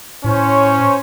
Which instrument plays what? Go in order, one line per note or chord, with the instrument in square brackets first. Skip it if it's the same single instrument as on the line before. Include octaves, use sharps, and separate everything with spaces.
[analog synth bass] A2 [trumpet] C#4 [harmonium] C5 C#5